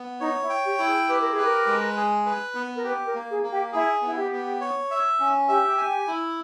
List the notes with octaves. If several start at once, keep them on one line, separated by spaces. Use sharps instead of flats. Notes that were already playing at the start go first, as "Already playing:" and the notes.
Already playing: B3
D#4 C#5
E4
G5
G4
E4
G#4
G4 B4
A#4
G#4
B4
A#4
G#3
G#4
B4
B3
A#4
G4 B4
A#4
A#3
G#4
A#3
G4
E4 G#4
B3 E4
G4
B3
C#5
E5
C#4
G4 E5
G#5
E4